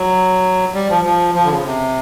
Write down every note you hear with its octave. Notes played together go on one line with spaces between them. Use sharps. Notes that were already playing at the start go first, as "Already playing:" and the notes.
Already playing: F#3
G3
F3
F3
F3
D3
C#3
C3